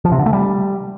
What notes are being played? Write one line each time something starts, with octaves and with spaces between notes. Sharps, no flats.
F3
C3
D3
A3
G3